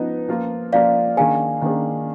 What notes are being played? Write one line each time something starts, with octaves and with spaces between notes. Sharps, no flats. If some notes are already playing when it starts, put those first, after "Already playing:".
Already playing: F3 B3 D#4 B4
F3 A#3 F4
F3 A#3 F4 D5 F5
D#3 A#3 D4 G#4 F5 G#5
D#3 A#3 D4 G#4